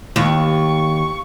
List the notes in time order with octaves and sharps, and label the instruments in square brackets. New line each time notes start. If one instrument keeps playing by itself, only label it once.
[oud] D#2 [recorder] C#6